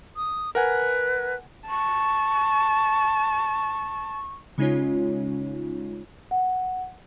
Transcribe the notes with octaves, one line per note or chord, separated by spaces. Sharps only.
D#6
A#4 B4 F#5 G#5
A5 C#6
C#3 G#3 C#4 D#4 F4 C#5
F#5